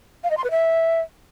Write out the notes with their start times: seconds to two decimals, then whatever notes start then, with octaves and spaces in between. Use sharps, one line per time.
0.23 F5
0.30 D#5
0.37 C6
0.44 B4
0.50 E5